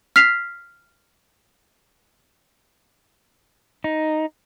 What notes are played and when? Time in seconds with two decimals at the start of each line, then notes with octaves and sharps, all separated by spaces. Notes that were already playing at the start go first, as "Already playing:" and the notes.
0.16 F6 B6 C7 F7
3.84 D#4